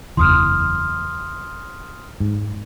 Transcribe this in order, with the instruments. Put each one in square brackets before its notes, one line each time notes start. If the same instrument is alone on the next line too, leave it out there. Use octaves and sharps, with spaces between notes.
[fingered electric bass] F#1 E2 E3 [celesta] C6 D#6 F6
[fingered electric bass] G#2